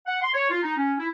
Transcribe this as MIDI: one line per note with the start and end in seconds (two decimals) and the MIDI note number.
0.06 0.21 78
0.22 0.30 84
0.34 0.49 73
0.50 0.58 65
0.62 0.77 63
0.77 0.93 61
0.99 1.07 64